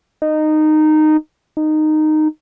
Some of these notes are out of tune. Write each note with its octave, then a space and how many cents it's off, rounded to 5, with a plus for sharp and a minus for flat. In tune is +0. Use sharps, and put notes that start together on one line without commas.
D#4 -15
D#4 -15